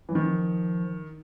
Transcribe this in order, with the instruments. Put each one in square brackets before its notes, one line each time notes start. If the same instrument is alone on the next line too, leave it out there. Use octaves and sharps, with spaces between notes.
[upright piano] E3 [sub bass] F#3
[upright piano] D#3 [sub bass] F3